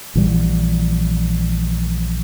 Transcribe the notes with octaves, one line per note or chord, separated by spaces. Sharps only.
A#1 E3 G3